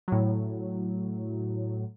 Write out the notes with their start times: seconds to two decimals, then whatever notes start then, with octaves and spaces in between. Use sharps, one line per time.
0.08 A2 F#3